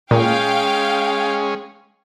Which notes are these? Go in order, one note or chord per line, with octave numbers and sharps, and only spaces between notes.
A#2 G#3 C#4 F5 G5